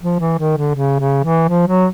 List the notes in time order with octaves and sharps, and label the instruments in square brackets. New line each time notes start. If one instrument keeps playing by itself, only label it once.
[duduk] F3
E3
D#3
D3
C#3
C#3
E3
F3
F#3